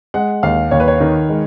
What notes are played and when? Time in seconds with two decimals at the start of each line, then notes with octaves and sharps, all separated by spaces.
0.14 G#3 F#5
0.43 D#2 F5
0.71 D#2 C#5
0.80 B4
0.88 C#5
1.01 D#3
1.29 G#3